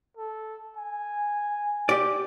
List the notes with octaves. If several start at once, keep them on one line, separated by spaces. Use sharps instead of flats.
A4
G#5
G4 D5